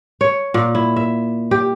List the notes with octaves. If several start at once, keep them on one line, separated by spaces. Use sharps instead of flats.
C#5
A#2
E4
E5
G4